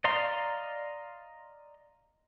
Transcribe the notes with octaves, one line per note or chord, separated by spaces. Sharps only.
D5 D#5 F5 A#5 C6